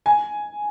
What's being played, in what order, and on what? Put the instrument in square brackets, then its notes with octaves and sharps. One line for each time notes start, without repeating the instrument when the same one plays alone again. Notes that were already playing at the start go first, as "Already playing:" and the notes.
[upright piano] G#5